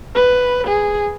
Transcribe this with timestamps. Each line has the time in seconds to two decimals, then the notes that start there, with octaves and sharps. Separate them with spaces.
0.15 B4
0.67 G#4